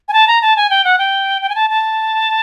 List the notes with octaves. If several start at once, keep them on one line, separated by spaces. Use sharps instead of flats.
G#5
A5
A#5
A5
G#5
G5
F#5
G5
G5
G#5
A5
A5